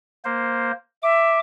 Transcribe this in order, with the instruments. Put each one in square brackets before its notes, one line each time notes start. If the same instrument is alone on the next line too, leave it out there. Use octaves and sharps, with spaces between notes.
[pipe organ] A#3 C5
[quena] E5 [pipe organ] D6